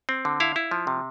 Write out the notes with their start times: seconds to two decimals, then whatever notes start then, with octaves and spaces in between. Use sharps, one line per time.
0.09 C4
0.25 D3
0.40 E4 F5
0.56 E4
0.71 F3
0.87 C3